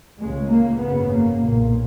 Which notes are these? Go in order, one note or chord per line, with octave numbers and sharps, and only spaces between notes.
C#2 C#3 G#3
A#3
G#1 F#2 C#3 B3
A#3
B1 A#2